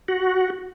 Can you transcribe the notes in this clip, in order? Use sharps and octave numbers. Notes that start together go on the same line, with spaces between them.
F#4